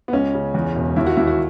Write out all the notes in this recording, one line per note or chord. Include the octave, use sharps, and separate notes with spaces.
B3
C#2 C#4
C#3
E2
E1
D#2 E4
F#4
D#2 E4
F#4